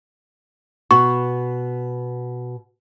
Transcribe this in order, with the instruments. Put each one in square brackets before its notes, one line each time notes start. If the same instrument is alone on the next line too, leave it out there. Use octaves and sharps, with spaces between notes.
[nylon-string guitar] B2 F#4 [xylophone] C#6